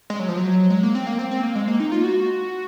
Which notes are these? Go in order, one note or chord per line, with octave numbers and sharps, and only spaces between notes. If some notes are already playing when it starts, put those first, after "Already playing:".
G#3
F#3
F3
F#3
G#3
A#3
C4
A#3
C4
C4
A#3
G#3
A#3
D#4
F4
F#4